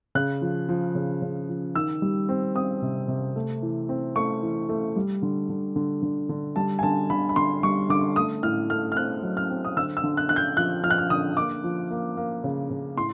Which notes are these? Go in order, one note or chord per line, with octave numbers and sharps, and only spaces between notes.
C#3 F#6
F3
F3
C#3
C#3
F3
D#3 E6
G3
C4
C4 D#6
C3
C3
A3
E3
C4
A3 C#6
E3
A3
G3
D3
D3
D3
D3
D3
G3 A5
G#5
D3 A5
D3 B5
B5
D3 C6
G3 C#6
D3 D6
A3 D#6
A2 F6
A3 F6
F6
C4 F#6
F#3
F6
C4
D#6
D3 E6
E6
D3
F#6
D3 F#6
G6
F3 F#6
F3 F6
F#6
F6
D3 D#6
A#3 D6
F3
A#3
A#3
C#3
C#3
A2 C6